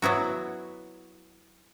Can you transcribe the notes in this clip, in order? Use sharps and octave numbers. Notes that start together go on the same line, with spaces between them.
F#3 B3 E4 F#4